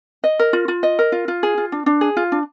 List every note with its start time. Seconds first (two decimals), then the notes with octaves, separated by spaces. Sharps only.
0.24 D#5
0.39 A#4
0.53 F4
0.68 F4
0.83 D#5
0.99 A#4
1.12 F4
1.28 F4
1.43 G#4
1.58 F4
1.72 D4
1.86 D4
2.01 G#4
2.17 F4
2.32 D4